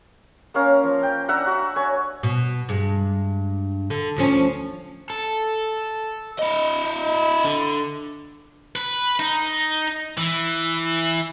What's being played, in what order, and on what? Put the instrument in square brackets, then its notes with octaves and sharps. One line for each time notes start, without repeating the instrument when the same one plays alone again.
[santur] A#3 C#4 F5 A#5
F3
G5
D4 E5 F#5 A#5
F#4
C#5 G#5
[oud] B2
G2 G#3
D3
D2 F3 C#4
[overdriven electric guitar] A4
E4 D#5
D3
[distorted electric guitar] B4
D#4
E3